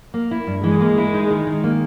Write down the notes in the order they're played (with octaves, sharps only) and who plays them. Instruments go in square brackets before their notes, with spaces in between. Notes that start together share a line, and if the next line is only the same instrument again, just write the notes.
[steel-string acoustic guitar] A#3
E4
G2
[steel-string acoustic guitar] E3 [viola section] G#3
[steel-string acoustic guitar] A#3
E4
D#4
D#3
D#3
A#3